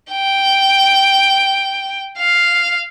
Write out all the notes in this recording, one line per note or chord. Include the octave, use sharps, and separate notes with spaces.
G5
F5